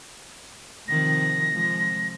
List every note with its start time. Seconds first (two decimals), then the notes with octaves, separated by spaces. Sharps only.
0.88 C3 D#3 F3 A#6
1.51 F3 G#3